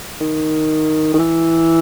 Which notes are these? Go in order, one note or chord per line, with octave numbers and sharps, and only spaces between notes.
D#3
D#3
E3